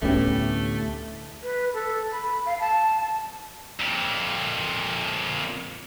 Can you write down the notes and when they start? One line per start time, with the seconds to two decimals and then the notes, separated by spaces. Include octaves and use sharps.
0.02 D2 A2 C3 A3 B3 C#4 G4
1.43 B4
1.74 A4
2.12 B5
2.46 F5
2.60 A5
3.80 F2 A#2